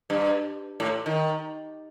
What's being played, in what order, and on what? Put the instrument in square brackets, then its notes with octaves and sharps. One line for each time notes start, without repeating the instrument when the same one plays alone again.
[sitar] G2
A2
D#3